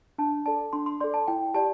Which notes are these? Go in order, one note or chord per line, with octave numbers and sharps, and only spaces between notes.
D4 A5
A4 D5 A5
D4 C6
C6
A4 D5 C6
A5
E4 G5
G4 D5 A5